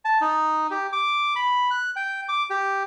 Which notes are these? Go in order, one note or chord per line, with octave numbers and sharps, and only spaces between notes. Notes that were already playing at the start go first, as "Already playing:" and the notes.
A5
D#4
G4
D6
B5
F#6
G5
D6
G4